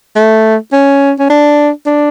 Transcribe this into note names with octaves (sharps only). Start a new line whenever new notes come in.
A3
C#4
C#4
D4
D4